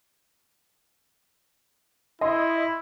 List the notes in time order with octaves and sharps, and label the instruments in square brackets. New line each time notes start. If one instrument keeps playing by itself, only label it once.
[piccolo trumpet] E4 [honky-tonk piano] D#5 C6